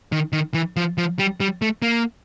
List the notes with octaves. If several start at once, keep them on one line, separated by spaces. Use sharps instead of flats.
D#3
D#3
E3
F3
F3
G3
G3
A3
A#3